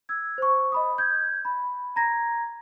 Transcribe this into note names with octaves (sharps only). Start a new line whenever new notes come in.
E6 G#6
C5 C#6
D#5 B5 D#6
G6 G#6
B5
A#5 G#6 A#6